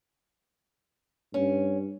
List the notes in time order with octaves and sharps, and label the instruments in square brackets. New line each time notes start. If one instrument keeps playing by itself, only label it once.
[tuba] G2 [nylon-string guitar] C#4